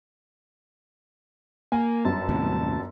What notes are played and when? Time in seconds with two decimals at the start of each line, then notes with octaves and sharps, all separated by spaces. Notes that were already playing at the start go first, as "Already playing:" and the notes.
1.72 A#3 G#5
2.05 G1 F#2 A5
2.29 D#2 A2 C3